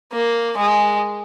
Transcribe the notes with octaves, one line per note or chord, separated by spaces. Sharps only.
A#3
G#3